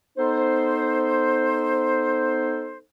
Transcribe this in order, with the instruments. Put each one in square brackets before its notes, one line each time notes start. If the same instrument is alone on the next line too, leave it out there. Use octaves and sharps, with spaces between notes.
[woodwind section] B3 D#4 A4 C5